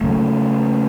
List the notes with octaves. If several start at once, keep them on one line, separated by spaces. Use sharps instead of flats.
C#3 F#3 A3